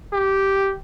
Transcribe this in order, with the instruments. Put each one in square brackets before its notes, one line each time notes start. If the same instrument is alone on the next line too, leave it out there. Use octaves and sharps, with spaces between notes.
[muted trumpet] G4